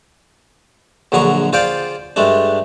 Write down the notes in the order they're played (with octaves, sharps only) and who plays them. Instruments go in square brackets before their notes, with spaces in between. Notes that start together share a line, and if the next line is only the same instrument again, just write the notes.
[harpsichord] A#1 D3 F#3 G#4 A#5 C#6
F4 G#4 C5 D5 F5 G5
G2 G#3 A3 D4